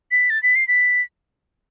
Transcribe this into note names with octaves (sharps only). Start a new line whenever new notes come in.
B6
A6
B6
C7
B6